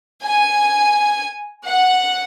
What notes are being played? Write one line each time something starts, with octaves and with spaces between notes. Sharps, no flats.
G#5
F#5